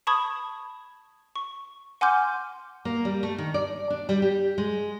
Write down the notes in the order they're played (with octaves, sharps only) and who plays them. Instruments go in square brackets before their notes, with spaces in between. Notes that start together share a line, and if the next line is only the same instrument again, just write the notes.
[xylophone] A5 B5 C#6 D#6 G#6
C#6
F#5 G#5 C6 D6 F6 G6
[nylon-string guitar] A#3
G3
A3
D#3
D5
D4
G3
G4
G#3